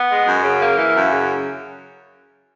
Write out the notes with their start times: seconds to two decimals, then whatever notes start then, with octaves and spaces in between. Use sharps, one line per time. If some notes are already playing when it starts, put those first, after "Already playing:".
Already playing: B3
0.10 G#3
0.26 F#2
0.44 C#3
0.61 A#3
0.77 E3
0.95 F#2
1.12 C#3